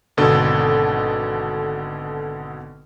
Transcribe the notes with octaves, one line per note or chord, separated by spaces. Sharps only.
G#1 B2 D3 A4